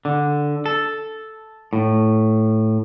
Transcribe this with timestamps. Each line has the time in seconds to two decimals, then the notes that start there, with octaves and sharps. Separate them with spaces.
0.05 D3
0.66 A4
1.73 A2